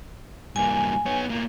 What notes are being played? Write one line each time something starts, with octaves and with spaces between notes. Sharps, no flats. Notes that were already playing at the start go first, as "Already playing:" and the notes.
G2 A#3 G#5
B3 C#5
A2 A#3